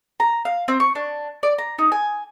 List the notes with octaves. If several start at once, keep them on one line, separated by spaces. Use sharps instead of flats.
A#5
F5
C4
C#6
D4
D5
A#5
D#4
G#5